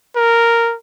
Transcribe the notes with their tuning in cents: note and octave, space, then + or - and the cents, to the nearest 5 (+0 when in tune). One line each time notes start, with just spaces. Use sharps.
A#4 -5